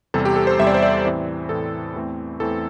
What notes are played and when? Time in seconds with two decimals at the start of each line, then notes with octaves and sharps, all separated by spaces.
0.14 E2 C3 G3 A4
0.25 G4
0.36 A4
0.47 C5
0.59 E2 C3 G3 E5
0.67 D5
0.74 C5
0.83 D5
1.04 A2 E3 C4
1.49 A2 E3 C4 A4
1.94 E2 E3 A3 C4
2.40 E2 E3 A3 C4 A4